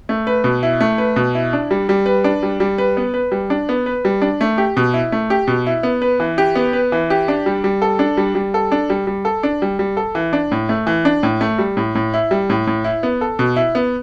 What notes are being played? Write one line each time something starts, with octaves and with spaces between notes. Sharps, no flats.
A3
B4
B2
E4
A3
B4
B2
E4
D4
G3
G3
B4
D4
G3
G3
B4
B3
B4
G3
D4
B3
B4
G3
D4
A3
G4
B2
E4
A3
G4
B2
E4
B3
B4
E3
G4
B3
B4
E3
G4
D4
G3
G3
A4
D4
G3
G3
A4
D4
G3
G3
A4
D4
G3
G3
A4
E3
D4
A2
A3
E3
D4
A2
A3
G3
A2
A2
E4
G3
A2
A2
E4
B3
A4
B2
E4
B3